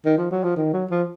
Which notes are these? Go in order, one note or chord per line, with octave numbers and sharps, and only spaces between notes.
D#3
F3
F#3
F3
D#3
F#3
F3